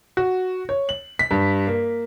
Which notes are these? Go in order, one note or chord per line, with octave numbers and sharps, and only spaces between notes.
F#4
C#5
F#7
B6
G2
A#3